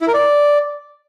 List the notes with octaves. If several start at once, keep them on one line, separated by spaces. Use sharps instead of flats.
E4
A#4
D5